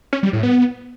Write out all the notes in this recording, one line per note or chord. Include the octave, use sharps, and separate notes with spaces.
C#4
G3
A2
B3